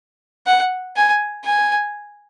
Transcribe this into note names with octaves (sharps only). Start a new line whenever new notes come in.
F#5
G#5
G#5